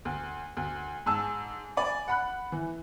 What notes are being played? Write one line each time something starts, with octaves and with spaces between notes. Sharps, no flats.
D2
D2
G#2 G#5 A5 E6
D5 G#5 B5
F#5 B5 F#6
E3